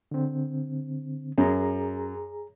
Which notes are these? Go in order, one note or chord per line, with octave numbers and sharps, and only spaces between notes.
D3 C4
F#2 G#4 A#5